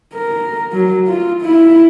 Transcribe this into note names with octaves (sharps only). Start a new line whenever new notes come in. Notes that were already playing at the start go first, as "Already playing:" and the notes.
A#4
F#3
F4
E4